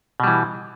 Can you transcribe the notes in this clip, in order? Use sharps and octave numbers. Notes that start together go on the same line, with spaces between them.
B2 E3 G3